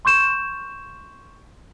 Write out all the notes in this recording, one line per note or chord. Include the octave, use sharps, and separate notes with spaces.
C6 C#6 G6 E7